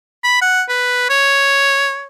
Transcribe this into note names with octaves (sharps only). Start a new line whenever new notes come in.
B5
F#5
B4
C#5